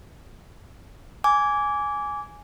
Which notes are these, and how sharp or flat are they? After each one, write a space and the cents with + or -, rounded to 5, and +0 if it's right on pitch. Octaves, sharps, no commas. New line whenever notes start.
G#5 +0 D6 -20